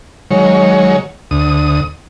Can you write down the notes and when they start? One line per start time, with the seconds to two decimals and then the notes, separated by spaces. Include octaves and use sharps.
0.31 D#3 F#3 G#3 C#5
1.31 D2 D#6